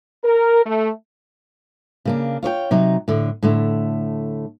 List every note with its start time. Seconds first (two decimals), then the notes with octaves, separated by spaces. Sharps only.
0.24 A#4
0.66 A3
2.05 C#3 A#3 D4
2.43 F4 C#5 D5 G5
2.71 C3 F#3 D#4
3.08 A2 D3
3.43 A2 D3 A3